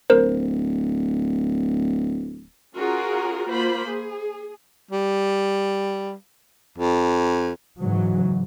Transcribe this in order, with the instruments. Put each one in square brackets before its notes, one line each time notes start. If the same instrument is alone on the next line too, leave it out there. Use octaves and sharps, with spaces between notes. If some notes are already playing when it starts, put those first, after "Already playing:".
[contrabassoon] D1 [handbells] A#4 C5
[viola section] C#4 F4 F#4 G#4 A#4
A#3 F4 C5 B5
G#4
[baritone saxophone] G3
F2
[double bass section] G#2 C#3 E3 F#3